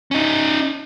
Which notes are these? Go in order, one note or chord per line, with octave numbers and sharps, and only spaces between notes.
C#4 D#4